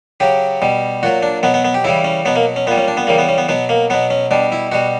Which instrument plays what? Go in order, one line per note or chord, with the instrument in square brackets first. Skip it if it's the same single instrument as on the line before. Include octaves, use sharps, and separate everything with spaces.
[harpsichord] C#3 F#3 G4
B2 G3
A#2 F#3 F#4
D4
B2 F#3 B3
B3
B3
G4
C#3 E3 G3 E4
C#4
B2 F#3 B3
A#3
C#4
A#2 B3
G3
C#4
D4
B3
C#3 E3 G3 A#3
B3
C#4
B3
B2 F#3 B3
A#3
B2 F#3 B3
C#4
B2 G3 D4
E4
B2 G3 F#4